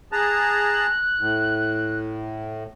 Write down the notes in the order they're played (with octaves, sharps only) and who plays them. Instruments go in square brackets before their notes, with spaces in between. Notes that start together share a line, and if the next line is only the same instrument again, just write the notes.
[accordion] G#4 A5 A#5 [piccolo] F#6
[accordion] A2